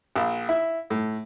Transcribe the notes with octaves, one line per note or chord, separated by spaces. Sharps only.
A#1
E4
A2